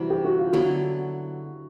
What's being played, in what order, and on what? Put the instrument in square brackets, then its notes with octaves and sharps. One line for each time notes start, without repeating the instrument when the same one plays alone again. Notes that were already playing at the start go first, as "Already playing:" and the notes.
Already playing: [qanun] C3 E3 G3 [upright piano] F#4
[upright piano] G4
F#4
F4
[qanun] D3 F#3 B3 E4 [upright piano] F#4